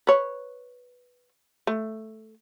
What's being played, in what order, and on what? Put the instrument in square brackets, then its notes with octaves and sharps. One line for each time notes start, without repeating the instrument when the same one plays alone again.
[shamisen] B4 C#5
A3